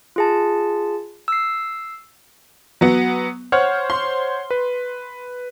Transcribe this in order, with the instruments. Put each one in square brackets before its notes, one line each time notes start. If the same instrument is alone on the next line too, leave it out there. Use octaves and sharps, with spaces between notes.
[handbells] F4 G#4 A5
E6 C7
[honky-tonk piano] F#3 B3
[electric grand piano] C5 C#5 F#5 [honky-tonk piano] F6
[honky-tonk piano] C6
[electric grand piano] B4